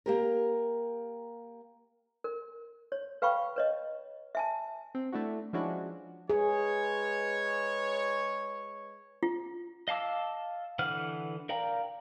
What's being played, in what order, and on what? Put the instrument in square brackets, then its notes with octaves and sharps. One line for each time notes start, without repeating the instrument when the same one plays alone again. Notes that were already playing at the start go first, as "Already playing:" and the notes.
[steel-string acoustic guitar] A#3 G4 A#4
[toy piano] A#4
C#5
B4 F5 G5 B5 C#6
B4 C#5 D#5
E5 G#5 A5
[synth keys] C4
A3 D4 E4 F#4
F3 G#3 C#4 D4 E4 F#4
[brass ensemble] G#3 B4 C#5 [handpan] G#4
[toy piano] F4
[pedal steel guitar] D#5 F5 A5 D6 E6
D3 E3 B4 F#5 F6
A#4 D5 F5 G5 A#5